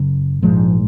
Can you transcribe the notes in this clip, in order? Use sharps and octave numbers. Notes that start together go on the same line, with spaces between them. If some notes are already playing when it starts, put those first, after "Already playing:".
Already playing: F#1 F#2 C#3
A#1 G#2 F3 G#3